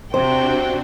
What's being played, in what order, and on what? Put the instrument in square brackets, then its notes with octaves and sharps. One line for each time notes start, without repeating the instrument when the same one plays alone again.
[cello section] C3 [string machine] C4 D4 F#4 [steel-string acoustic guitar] C5 [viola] G5